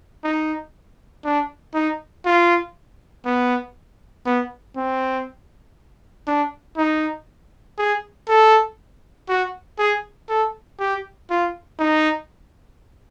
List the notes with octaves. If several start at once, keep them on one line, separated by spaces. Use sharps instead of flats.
D#4
D4
D#4
F4
B3
B3
C4
D4
D#4
G#4
A4
F#4
G#4
A4
G4
F4
D#4